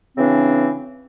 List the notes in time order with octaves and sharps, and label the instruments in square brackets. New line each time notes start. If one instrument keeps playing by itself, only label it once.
[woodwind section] C#3 E3 C4 D4